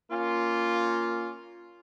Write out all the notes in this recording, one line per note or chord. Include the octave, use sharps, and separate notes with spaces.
A#3 C#4 F4